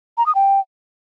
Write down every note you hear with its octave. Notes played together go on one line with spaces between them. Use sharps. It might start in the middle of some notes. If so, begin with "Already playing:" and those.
A#5
D#6
G5